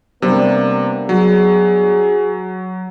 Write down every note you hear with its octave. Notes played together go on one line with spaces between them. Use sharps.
C3 G3 A#3 B3 D4
F#3 G#4